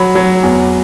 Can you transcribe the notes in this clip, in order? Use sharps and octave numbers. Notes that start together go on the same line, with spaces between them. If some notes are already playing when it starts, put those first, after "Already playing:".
Already playing: F#3 B5
F#3
E2